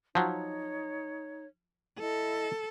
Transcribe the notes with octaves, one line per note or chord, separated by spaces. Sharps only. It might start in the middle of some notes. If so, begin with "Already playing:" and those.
F3 F#3 D#4 C#5
E4 A4 D#5